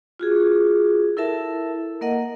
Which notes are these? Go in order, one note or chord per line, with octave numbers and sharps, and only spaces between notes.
F4 F#4 G#4
E4 A4 A#4 E5 A5
A#3 A#4 D#5 F#5